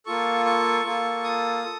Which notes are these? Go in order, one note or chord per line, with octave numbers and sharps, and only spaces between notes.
A#3 F4 A4 C#6
C#6
A#3 F4 A4
D#6
A4